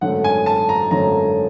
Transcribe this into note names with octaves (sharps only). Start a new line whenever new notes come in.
G#1 F#2 D3 F#3 A3 F#5
G#5
A5
A#5
G#1 F#2 D3 F#3 A3 A#5